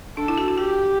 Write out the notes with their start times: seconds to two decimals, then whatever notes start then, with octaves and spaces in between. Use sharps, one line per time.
0.17 D4 A4
0.28 E4
0.38 F#4
0.48 E4
0.58 F#4 G4